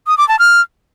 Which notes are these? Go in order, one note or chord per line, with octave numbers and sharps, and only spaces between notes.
D#6
D6
A5
F6